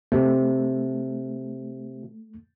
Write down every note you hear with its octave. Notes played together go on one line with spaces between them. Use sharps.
C3 A3